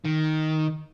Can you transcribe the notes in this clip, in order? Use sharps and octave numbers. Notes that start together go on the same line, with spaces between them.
D#3